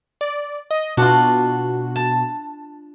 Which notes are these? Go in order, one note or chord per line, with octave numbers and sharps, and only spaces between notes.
D5
D#5
B2 D4 F4 F#4
A5